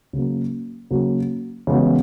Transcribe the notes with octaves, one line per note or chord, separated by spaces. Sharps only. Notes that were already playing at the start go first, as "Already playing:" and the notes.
C#3 F#3 A#3
C#3 F#3 A#3
C#3 E3 G#3 B3 F#4